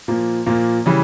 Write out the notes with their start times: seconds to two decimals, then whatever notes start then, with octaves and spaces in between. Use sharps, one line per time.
0.08 A#2 F3 A#3
0.46 A#2 F3 A#3
0.86 C#3 E3 G3